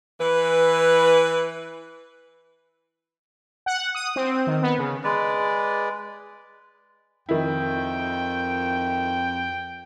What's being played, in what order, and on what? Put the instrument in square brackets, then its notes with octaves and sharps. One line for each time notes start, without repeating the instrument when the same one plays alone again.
[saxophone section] E3 B4
[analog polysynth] F#5
D#6
C4
D#3
B3
C#3
[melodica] G#3 B4 D5
[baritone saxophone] F2 [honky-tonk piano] D#3 E4 [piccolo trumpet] G5